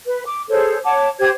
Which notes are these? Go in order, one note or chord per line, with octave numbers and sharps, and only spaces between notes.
B4
D6
G#4 A4 C5 C#5
C#5 F#5 A5 D6
G4 C5 G#6